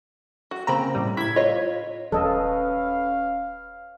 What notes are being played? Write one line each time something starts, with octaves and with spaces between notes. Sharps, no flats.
F#4
C#3 A#3 C4 A#5 B5
A2 G3
E4 G#6 B6
F4 C#5 D#5
D#1 C#4 A4 B4 D#5 F5